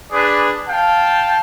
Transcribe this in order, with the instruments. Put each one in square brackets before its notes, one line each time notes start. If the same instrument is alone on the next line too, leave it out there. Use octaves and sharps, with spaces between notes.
[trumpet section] D4 G#4 B4 D5
F5 G5 A5